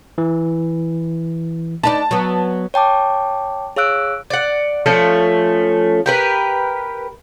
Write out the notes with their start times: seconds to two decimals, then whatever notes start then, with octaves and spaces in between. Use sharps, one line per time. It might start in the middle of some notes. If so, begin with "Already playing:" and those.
0.18 E3
1.83 D4 D#4 B4 A5
2.11 F#3 B3
2.74 C#5 G5 A5 D6
3.76 G#4 C#5 F5 E6 F#6 D7
4.30 D5 F#5
4.86 F3 A3 C#4
6.06 G4 A#4 B4